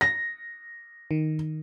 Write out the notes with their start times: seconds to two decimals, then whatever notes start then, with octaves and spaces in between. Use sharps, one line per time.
0.01 A#6
1.11 D#3